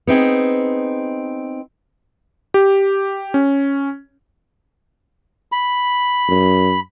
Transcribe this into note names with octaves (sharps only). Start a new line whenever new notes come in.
B3 C4 D#4 G#4
G4
C#4
B5
F#2